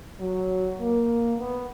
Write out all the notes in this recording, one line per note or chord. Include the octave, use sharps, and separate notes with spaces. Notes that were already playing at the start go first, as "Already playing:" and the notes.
F#3
A#3
B3